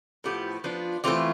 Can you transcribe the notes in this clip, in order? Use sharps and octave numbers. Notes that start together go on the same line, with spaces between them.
A2 F3 B3 E4 G4
F3 B3 D4 F4
E3 A3 C4 F4 G4